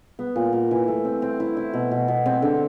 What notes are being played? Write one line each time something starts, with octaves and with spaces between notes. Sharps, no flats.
B3
A#2
A#2
E3
A3
C4
C4
E4
E4
B2
B2
B2
C4
D3